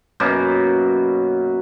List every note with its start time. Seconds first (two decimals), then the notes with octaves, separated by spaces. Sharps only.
0.20 F#2 B2 A#3